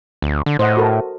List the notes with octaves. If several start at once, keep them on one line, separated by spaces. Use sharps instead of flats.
D2
D3
A2 C5 D#5 F#5
F#4 A4 A#4